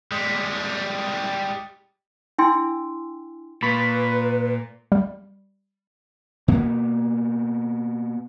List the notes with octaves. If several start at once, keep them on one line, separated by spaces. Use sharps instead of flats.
G3 G#3
D4 E4 G5 G#5 C6 E6
A#2 B4 B5 C#6 B6
G3
B2 A#3 B3